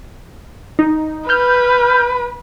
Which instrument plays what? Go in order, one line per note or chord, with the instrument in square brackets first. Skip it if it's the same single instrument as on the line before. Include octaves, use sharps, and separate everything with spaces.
[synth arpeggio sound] D#4
[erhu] B4 [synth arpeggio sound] F6 G6